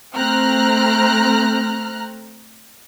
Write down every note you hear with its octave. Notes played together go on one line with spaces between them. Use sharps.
A3 C4 A#5 F6 F#6